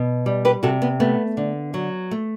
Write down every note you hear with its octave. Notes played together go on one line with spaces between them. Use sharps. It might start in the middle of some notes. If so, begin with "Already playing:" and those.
Already playing: B2
G3
G4 B4
C3 F#4 A4
B3
A3 B3
D3
F#3
A3